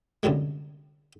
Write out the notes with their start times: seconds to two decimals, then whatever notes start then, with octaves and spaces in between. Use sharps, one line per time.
0.23 C2 F#2 D3 F#3 G#3